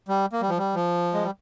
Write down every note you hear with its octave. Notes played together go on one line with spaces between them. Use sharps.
G3
A#3
G3
F3
G3
F3
G#3
G3